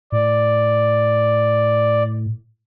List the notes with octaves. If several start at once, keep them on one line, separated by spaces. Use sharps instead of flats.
A2 D5